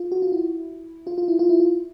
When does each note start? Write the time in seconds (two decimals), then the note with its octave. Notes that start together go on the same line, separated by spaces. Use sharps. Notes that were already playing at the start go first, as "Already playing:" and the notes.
Already playing: F4
0.12 F#4
0.22 F4
0.32 E4
1.07 F4
1.18 F4
1.28 E4
1.39 F4
1.49 E4
1.60 F4